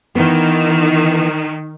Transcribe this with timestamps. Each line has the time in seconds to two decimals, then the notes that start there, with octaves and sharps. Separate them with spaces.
0.15 D#3 E3 B3